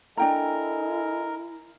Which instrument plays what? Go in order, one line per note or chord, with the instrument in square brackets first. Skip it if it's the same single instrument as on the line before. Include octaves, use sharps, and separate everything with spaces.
[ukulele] D4 G5 A#5 [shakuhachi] E4 [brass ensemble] A4 D#5 G#5 [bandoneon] A#4